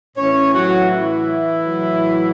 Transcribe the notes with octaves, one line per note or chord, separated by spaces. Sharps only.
A2 E3 C#4 C#5
F#3 F#4
E3 E4
A2 F#3